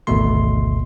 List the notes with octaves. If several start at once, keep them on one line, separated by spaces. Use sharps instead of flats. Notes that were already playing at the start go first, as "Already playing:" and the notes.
G#1 D2 B2 A3 C6